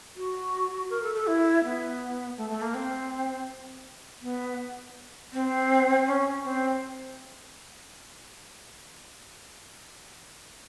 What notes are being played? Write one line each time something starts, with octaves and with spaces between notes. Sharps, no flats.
F#4
A#4
A4
A4
E4
B3
A3
A3
A#3
C4
B3
C4
C#4
C4